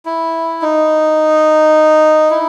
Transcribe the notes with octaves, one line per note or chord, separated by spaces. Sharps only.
E4
D#4
E4